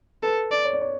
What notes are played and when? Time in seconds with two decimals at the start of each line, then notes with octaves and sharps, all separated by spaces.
0.23 A4 B4
0.51 D5
0.65 C#5
0.73 D5
0.81 C#5